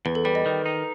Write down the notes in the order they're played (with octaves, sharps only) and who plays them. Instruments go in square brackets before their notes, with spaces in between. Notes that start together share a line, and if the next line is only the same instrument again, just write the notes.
[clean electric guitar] E2 [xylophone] B4
[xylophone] A4
[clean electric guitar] G3 [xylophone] B4
[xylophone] D#5
[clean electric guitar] D#3
D#4